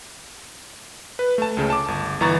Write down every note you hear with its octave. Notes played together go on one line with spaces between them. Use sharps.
B4
A3 A5
C#2 C#3
A5 D6
G1
G1 E3 A#5 C#6 A6